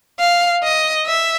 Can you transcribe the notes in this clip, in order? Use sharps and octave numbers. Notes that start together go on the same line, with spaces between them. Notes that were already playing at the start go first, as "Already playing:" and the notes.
F5
D#5
E5